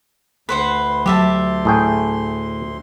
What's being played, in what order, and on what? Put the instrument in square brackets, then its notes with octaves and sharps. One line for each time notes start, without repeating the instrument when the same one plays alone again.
[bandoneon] D2 C6 [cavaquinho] B4 C5 F#5
[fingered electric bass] F#3 [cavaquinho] G4 E5 A5
[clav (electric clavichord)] A2 G#4 G5